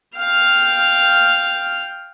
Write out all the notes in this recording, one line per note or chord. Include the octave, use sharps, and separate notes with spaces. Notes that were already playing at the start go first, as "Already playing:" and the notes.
F5 G5